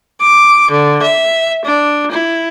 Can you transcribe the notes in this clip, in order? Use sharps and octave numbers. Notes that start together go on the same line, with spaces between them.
D6
D3
E5
D4
E4